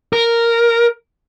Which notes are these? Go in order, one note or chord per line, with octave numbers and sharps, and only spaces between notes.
A#4